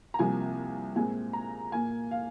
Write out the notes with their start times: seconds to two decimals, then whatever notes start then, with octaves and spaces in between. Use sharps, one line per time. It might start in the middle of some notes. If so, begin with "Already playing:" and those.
0.14 A#5
0.18 C2 C3 F3 A#3 G#5
0.95 A#2 G#3 C4 G#5
1.33 A#5
1.72 A#2 A#3 G#5
2.11 F5